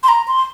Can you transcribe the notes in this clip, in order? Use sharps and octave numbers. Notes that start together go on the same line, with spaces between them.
C6
A#5
C6